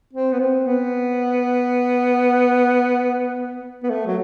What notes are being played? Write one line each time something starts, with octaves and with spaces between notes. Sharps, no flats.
C4
B3
C4
B3
B3
A3
F#3